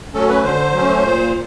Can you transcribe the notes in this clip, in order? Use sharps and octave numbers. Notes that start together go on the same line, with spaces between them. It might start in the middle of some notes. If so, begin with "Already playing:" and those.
F#3 A3 C#4 A4
B4
D3 C5
F#3 A3 C#4
A#2